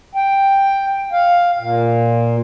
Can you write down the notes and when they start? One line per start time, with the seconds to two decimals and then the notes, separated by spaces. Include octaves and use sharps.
0.15 G5
1.12 F5
1.59 A#2